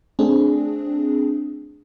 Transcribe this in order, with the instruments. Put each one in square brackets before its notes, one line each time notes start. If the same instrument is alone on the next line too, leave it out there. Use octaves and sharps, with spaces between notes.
[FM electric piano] A3 C4 D4 G#4